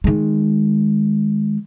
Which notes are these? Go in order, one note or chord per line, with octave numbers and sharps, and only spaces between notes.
D#3 G#3